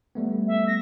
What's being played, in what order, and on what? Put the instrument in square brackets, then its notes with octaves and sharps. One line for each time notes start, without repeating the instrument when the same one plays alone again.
[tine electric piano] G3 A3 B3
[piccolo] E5
A#6